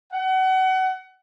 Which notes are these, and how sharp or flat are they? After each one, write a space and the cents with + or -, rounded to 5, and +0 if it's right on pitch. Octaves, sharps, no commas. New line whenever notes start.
F#5 +30